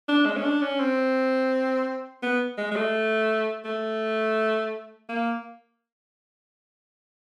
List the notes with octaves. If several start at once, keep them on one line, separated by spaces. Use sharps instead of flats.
D4
G#3
C#4
D4
C#4
C4
B3
G#3
G#3
A3
A3
A#3